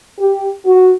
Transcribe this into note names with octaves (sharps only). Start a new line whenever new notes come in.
G4
F#4